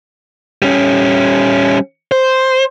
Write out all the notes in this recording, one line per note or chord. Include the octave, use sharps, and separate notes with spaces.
G3 C#4
C5